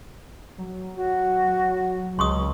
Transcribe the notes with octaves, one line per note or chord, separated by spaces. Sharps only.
F#3
F#4
C#2 C6 C#6 D#6